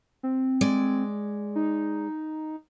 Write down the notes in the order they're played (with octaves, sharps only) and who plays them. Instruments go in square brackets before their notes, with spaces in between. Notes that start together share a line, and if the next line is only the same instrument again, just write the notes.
[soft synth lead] C4
[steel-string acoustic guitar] G#3 D5
[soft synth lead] D#4